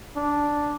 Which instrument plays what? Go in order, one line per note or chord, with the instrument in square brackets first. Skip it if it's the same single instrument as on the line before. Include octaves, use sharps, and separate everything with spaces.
[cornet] D4